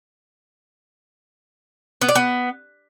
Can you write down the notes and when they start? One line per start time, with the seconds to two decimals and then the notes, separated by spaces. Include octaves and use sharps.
2.01 B3
2.08 D5
2.15 B3